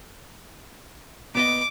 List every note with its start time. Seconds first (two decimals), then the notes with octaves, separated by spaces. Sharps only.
1.35 A#2 B3 D#5 D6